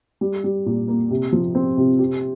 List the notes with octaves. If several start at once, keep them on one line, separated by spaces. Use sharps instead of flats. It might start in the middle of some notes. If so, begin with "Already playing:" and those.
G3
G3
A#2
A#3
C3
F3
C4
C3
G4